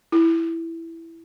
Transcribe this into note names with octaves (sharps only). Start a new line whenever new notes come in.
E4